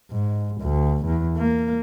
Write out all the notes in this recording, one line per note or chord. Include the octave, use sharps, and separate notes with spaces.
G#2
D2
E2
A#3